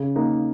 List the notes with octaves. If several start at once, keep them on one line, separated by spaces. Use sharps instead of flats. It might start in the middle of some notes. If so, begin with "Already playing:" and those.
Already playing: C#3
A#3 D#4